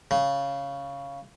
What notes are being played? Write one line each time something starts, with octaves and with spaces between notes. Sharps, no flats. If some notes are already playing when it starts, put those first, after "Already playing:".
C#3